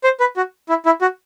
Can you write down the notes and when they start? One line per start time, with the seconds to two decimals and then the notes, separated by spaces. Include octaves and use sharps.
0.04 C5
0.20 B4
0.37 F#4
0.69 E4
0.86 E4
1.01 F#4